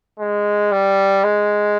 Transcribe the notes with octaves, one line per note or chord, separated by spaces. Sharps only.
G#3
G3
G#3